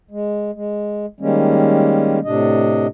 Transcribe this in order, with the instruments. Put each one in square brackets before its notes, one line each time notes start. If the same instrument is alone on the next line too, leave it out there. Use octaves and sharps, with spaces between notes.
[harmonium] G#3
G#3
D#3 G3 G#3 A#3 C#4
A2 C3 D4 D#5